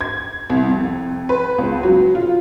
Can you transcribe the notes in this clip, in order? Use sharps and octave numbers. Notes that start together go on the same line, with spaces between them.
G#6
C2
F2
B4
C#2
F#3
F4